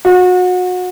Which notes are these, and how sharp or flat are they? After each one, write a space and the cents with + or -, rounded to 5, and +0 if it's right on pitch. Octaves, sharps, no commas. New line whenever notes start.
F#4 -30